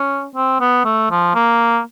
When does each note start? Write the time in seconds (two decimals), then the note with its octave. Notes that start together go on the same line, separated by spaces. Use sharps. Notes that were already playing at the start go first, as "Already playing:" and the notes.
Already playing: C#4
0.36 C4
0.60 B3
0.85 A3
1.11 F3
1.35 A#3